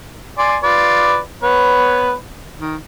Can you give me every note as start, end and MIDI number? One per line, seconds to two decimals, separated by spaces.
0.38 0.57 74
0.38 0.57 80
0.38 0.57 84
0.63 1.19 65
0.63 1.19 71
0.63 1.19 74
1.43 2.14 59
1.43 2.14 71
1.43 2.14 73
2.59 2.75 51